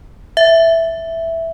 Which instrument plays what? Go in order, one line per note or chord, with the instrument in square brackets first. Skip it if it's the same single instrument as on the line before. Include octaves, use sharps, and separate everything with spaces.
[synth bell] E5